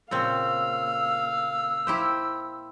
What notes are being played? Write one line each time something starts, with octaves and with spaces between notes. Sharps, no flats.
A#2 C#3 C4 F5 E6
E4 G4 C5